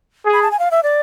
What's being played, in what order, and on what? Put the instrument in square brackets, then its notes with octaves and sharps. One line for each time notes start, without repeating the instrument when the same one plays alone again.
[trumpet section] G#4
[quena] B5
A5
G#5
F5
E5
D5